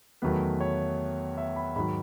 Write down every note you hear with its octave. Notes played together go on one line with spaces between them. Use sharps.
E2 D#3 F#3 A3 B4
C#5
E5
B5
G#2 D#3 F#3 B5